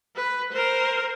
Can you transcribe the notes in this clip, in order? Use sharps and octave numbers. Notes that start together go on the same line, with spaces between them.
B4
A#4 C5